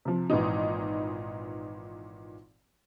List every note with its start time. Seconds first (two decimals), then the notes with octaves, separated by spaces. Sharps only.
0.05 C3 F3
0.30 G#1 A#2 E3 D#4